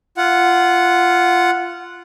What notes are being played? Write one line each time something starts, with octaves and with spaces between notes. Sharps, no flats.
F4 F#5